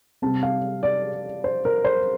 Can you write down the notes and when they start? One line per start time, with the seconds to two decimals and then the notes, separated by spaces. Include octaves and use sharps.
0.22 C3 G3 C4 A5
0.43 F5
0.83 D5
1.44 C5
1.65 A#4
1.85 C5